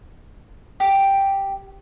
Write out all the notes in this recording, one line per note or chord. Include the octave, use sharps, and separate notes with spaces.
G4